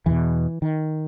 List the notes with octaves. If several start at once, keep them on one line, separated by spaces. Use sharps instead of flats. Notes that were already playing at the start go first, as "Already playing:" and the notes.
E2 B2 E3
D#3